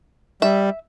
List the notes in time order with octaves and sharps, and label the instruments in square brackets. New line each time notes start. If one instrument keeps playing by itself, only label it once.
[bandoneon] G3 [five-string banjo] E5